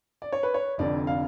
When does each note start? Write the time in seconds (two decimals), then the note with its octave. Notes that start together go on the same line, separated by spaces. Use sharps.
0.22 D5
0.32 C#5
0.43 B4
0.54 C#5
0.78 F1 F2 D3 D5
1.07 F5